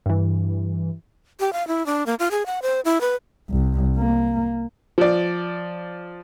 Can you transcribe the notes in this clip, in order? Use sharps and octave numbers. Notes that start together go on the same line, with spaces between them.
G2 E3
G4
F5
E4
D4
A#3
F4
G#4
F#5
C5
E4
B4
C2
A#3
F3 D5